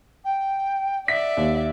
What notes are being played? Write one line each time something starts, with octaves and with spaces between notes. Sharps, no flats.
G5
D5 E5 F#5 B6
D#2